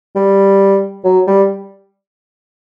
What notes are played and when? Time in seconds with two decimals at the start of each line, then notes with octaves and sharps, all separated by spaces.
0.16 G3
1.04 F#3
1.27 G3